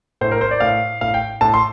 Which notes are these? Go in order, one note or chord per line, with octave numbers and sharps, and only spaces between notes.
A2 C5
A#4
C5
D5
A2 F5
A2 F5
G5
A2 A5
C6